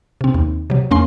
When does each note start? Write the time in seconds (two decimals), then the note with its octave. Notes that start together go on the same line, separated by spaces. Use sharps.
0.21 C3 C4
0.34 D#2
0.70 C3 F#3
0.91 E2 A#3 C#4 C6